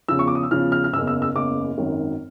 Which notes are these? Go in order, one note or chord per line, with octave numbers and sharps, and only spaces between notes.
E2 C#3 F3 E6
C#6
D6
D#6
E6
E2 C#3 F3 F6
F6
F6
F#1 E2 C#3 E6
E6
E6
F#1 E2 C#3 D6
G#1 F#2 D#3 F#3